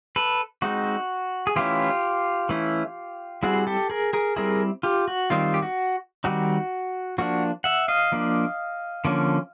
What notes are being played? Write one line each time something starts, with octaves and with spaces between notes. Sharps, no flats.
A4 B4
G#3 C4 D#4 F#4
G#4
E3 A3 C#4 E4 F4 G4
E3 A3 C#4 E4
G3 C4 E4 F#4 G#4
G4 A4
G#4 A#4
G#4 A#4
G3 C4 E4 G#4 A#4
F4 G4
F#4
D#3 G3 C4 D#4 F4
G4
F#4
D#3 G3 C4 D#4 F#4
F3 A#3 D4 F#4
E5 F#5
D#5 F5
F3 A#3 D4
D3 F3 A#3 C#4